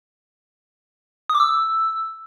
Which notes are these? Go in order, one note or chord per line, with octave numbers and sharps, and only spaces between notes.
D#6
D6
E6